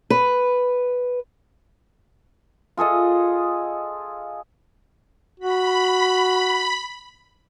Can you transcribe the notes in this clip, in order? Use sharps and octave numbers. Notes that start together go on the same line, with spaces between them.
B4
F4 G#4 A4 D#5
F#4 B5